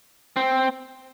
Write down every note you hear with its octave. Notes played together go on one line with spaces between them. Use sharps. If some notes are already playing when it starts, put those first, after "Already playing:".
C4